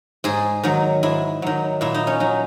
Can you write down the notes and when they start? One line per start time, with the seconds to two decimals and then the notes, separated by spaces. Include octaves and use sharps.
0.24 G#2 G#4
0.63 D#3 F#3
1.03 G#2 E4
1.42 D#3 F#3
1.81 A#2 E4
1.94 D#4
2.07 C#4
2.20 F#3 D#4